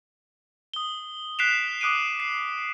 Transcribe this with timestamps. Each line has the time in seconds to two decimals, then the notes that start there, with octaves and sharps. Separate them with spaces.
0.74 D#6 G7
1.39 F#6 B6 C7 D7 E7 F7
1.81 D6 D#6 F#6 D7 D#7
2.20 C7